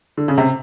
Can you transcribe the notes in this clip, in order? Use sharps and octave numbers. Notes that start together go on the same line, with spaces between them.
D3
C#3
C3